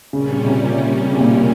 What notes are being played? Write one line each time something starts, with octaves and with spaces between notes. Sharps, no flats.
A#2 C#3 G3 C#4
C#3
C3
C#3
C3
A#2
C3
A#2